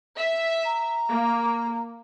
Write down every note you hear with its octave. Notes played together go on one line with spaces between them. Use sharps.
E5
A#5
A#3